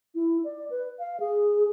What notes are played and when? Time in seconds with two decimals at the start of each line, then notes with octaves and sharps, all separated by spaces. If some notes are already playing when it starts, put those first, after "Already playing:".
0.15 E4
0.44 D5
0.70 B4
0.99 F5
1.20 G#4